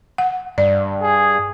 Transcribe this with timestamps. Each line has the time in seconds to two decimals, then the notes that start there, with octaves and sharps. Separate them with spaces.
0.18 F#5
0.58 G2 D5
1.02 G#4